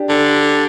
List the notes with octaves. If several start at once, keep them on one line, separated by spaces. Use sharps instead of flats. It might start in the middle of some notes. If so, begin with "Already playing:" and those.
Already playing: D4 G4
D3